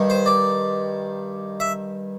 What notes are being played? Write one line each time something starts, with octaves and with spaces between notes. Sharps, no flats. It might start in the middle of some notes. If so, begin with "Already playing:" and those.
Already playing: G2 D#3
C5
D5
E5